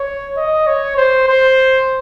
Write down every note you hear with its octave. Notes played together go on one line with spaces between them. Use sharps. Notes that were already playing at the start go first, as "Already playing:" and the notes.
Already playing: C#5
D#5
C#5
C5
C5